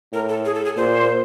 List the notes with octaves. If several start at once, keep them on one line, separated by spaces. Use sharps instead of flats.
A2 A#4
A4
G#4
A4
G#4
A#2 C5